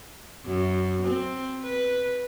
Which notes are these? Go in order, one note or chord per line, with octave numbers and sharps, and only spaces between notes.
F#2
C4
B4